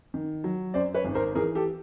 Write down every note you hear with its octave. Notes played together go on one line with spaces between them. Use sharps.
D#3
F#3
F#2 C5 D5
B4 C#5
G#1
A#4 C5
E3 G#4 A#4
G4 A4